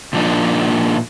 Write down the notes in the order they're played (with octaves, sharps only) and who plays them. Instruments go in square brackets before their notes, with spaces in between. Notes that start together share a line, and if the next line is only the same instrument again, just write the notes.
[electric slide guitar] A#2 F3 A#3 D4 D#4